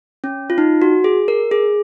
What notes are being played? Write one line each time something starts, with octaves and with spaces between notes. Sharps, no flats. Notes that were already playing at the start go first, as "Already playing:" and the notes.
C#4
F4
D#4
F#4
G#4
A#4
G#4